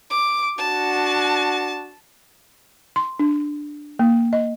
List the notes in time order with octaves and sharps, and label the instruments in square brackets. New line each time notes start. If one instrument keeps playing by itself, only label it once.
[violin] D6
[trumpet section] D4 F#4 [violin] A5
[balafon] C6
D4
A#3
D#5